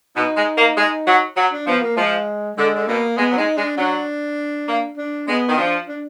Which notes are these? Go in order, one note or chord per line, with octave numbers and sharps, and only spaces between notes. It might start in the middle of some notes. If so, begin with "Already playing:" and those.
B2 D#4
G#3
A#3
G#3
F#3
F#3
D4
F3 B3
A#3
F3 G#3
D3 G#3
D3
B2 A#3
G#3 B3
F#3
G#3 D#4
G#3 D4
F#3 D4
A#3
D4
G#3 B3
D#3
F3 D4
D4